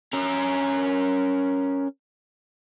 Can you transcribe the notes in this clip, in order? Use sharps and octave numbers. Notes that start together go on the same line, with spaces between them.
C#4 A#4